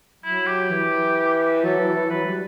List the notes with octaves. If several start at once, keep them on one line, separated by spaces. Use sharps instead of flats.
F#3 E4
G4
E3
F#3 A4
E3
E3
F#3 B4
G3